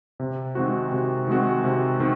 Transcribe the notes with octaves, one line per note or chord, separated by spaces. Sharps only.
C3
D#3 G#3 C4 F#4
C3
D#3 G#3 C4 F#4
C3
D#3 C4